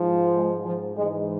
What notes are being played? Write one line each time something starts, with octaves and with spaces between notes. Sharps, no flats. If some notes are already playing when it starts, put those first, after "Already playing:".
Already playing: G#2 F3
G#3
F3
G#2 E3 G#3